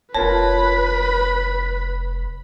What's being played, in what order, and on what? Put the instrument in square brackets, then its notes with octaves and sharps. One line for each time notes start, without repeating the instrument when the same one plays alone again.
[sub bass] F1 [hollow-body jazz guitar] F4 A#4 A5 [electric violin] B4 B5 [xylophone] C#5 A#6